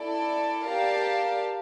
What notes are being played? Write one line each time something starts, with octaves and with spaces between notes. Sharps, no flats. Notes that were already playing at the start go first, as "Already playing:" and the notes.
Already playing: E4 A4 D5
G4 A#4 D5 F5 A5